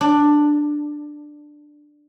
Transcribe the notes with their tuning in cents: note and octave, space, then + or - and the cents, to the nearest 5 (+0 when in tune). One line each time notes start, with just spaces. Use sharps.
D4 +10